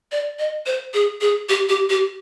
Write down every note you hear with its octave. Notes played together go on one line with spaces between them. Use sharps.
D5
D#5
C5
G#4
G#4
G4
G4
G4